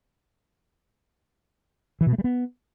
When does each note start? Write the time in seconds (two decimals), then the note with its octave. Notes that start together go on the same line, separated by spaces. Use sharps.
2.01 E3
2.07 B2
2.13 A3
2.18 G3
2.24 B3